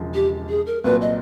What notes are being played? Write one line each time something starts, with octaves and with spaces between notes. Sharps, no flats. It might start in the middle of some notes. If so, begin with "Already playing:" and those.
Already playing: E1 C#3 F3 G#3
G4
G#4
A#4
C2 A#2 F#3 B4
D#5